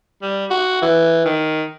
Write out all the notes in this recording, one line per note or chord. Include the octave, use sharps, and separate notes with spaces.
G3
F#4
E3
D#3